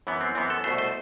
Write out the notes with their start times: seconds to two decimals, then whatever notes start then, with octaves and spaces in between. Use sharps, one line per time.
0.07 F#2 E3 B3
0.21 C4
0.35 F#2 E3 B3 C4
0.50 A4
0.64 C2 B2 A3 C5
0.78 C5